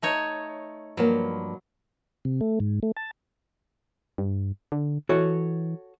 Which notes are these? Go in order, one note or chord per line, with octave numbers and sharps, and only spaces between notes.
A3 D#4 C#5
G2 F3 F#3 A#3
C3
A3
G#2
A3
A5
G2
D3
E3 F#4 A4 C#5